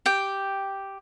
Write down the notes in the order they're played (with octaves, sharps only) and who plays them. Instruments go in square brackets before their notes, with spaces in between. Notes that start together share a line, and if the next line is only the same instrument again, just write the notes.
[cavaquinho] G4 G5